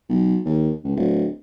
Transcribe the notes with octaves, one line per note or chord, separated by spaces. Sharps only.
B1
D#2
C#2
D1